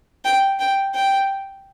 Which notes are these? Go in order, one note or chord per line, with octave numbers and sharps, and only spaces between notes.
G5
G5
G5